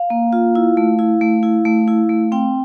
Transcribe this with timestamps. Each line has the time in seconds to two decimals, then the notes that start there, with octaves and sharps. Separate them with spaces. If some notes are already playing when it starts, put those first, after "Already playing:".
Already playing: F5
0.10 A#3
0.33 F4
0.55 E4
0.77 A3
0.99 E4
1.21 A3
1.43 E4
1.65 A3
1.88 E4
2.09 A3
2.32 C4 G5